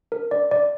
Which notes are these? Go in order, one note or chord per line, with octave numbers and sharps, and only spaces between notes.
A#4
D5
D5